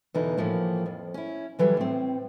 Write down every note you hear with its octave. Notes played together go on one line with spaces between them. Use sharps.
E2 B2 D3 E3 D#4
A2 E3 F3 A#3
F2
C#4 E4
D3 E3 F#3 G3
A2 C4